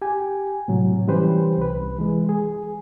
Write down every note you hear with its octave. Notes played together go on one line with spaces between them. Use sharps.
G4 G#5
A2 C3 F#3
E3 G3 C#4 G4 B4 C5
C2 B4
E3 G#3
G#4